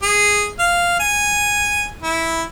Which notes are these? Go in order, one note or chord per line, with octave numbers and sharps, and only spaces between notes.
G#4
F5
G#5
E4